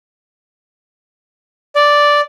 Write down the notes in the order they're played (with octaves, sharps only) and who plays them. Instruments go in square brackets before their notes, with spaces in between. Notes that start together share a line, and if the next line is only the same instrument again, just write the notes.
[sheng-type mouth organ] D5